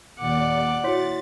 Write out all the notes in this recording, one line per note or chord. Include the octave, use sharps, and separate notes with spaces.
D#2 A#2 D5 F#5 D6
E4 F#4 C#5 C6 A6 B6